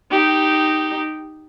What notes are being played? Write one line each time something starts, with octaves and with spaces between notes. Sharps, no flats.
D#4 G4